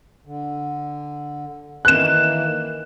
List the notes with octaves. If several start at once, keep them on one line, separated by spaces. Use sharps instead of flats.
D3
D#3 E3 A#3 F#6 E7